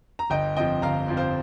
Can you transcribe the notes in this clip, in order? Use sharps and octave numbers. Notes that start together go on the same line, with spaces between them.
A#5
G1 D#5 G5
F2 F3 D#5 G5
G1 F5 A#5
F2 F3
C5 F5